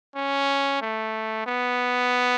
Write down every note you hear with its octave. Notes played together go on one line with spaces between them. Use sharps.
C#4
A3
B3